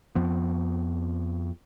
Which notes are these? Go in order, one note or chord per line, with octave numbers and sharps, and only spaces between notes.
F2 F3 B3